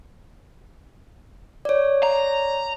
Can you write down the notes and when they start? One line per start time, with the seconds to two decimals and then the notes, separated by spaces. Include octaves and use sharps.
1.65 C#5 D5
2.03 A#5